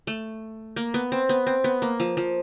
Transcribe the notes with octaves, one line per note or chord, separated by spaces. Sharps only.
A3
A#3
B3
C4
B3
C4
B3
A#3
F3
F3